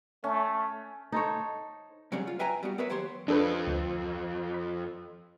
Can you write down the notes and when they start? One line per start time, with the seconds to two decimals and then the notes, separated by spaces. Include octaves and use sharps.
0.24 A3 C#4
1.12 D#4 A4 C5 C#5
2.12 C3 F#3 G3 C#4 G#4
2.27 F4
2.39 B4 E5 G5 G#5 A#5
2.63 G3 B3 F#4
2.78 B3 A#4 B4 C#5 E5
2.90 D#2 F#3 G4 C5 C#5 C6
3.28 F2 D4 A4 B4
3.67 D2
4.54 B5